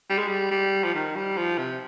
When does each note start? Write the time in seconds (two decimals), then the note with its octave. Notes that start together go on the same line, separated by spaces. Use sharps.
0.10 G3
0.18 G#3
0.28 G3
0.51 G3
0.84 F3
0.94 D#3
1.16 G3
1.37 F3
1.58 C3